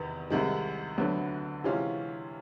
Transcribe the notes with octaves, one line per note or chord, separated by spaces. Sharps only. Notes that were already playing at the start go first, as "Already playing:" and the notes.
Already playing: E2 C3 D#3 B3
C2 C3 D#3 G#3
D2 D3 F#3 B3
C3 E3 G#3 C#4 F4